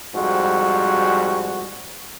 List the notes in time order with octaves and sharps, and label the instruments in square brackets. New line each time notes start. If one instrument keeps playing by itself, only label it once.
[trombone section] F2 G#2 G3 F#4